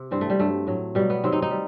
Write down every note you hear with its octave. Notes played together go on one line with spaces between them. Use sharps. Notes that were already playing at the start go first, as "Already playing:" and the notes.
Already playing: C3
G2 E3 G3 C4
A3
G3
G2 F#3 A3
A2 F#3
B2 F#3 G3
B3
C3 D#3 F#3 C4
D#4
D#4
G3